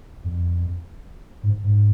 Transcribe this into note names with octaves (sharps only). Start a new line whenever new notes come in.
F2
G#2
G#2